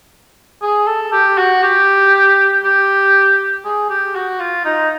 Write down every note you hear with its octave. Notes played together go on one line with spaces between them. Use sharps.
G#4
A4
G4
F#4
G4
G4
G#4
G4
F#4
F4
D#4